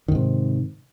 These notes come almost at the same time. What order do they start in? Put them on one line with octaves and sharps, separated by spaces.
D#3 G#2 C3